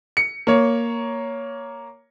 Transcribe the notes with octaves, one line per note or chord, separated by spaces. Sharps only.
C#7
A#3 C#5